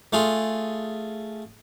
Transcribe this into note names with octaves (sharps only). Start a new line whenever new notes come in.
A3 F4 G#4